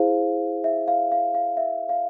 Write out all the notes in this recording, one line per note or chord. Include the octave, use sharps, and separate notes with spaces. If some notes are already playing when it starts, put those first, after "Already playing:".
Already playing: E4 G#4 C5 F5
E5
F5
F5
F5
E5
F5